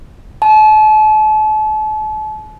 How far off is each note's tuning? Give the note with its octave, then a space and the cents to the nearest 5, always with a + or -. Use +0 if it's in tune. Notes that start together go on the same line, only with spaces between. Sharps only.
A5 -40